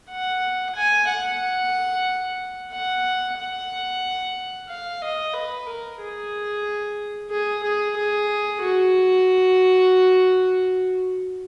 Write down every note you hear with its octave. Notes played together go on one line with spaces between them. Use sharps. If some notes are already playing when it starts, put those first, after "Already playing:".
F#5
G#5
F#5
F#5
F#5
F5
D#5
B4
A#4
G#4
G#4
G#4
G#4
F#4